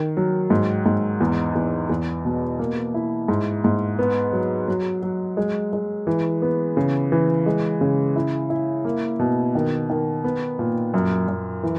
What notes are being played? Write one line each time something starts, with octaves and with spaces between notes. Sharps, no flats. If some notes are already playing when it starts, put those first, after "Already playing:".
Already playing: D#3
F#3
G#2
G#2
E2
E2
E2
B2
A#3
E4
G#2
G#2
B3
F#3
F#3
F#3
G#3
G#3
E3
B3
C#3
E3
G#3
C#3
E4
E4
A#3
B2
D#3
D#3
B3
A#2
F#2
F#2
E3